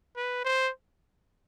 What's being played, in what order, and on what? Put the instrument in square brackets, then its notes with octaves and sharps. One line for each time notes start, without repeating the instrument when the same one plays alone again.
[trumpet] B4
C5